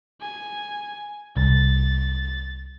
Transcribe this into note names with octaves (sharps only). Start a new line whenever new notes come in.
G#5
C2 A6